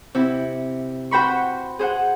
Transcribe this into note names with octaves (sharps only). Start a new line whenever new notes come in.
C3 E4
F#4 C5 G5 B5 C#6
G#4 C5 F#5